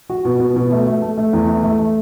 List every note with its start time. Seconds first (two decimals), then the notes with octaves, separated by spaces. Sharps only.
0.10 F#4
0.25 B2
0.40 B2
0.56 B2
0.72 A3
0.86 A3
1.02 A3
1.17 A3
1.33 E2
1.48 A3
1.63 A3
1.79 A3